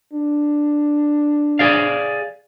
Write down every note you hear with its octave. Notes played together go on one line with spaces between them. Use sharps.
D4
G#4 D5 F5